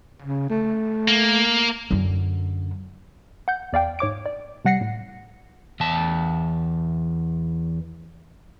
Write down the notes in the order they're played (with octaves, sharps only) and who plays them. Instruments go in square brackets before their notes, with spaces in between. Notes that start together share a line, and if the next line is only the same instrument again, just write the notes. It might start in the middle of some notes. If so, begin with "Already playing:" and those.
[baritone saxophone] C#3
A3
[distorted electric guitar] A#3
[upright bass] F#2 D3
[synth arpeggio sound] F#5 G6
E2 D5 F5 G5
G#2 C#5 D6 D7
D5
C3 G3 F#5 A#6 C7 C#7
A2
[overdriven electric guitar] E2 A5